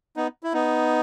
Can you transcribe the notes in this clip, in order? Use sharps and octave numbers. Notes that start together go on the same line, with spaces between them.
B3 D#4
E4
B3 D#4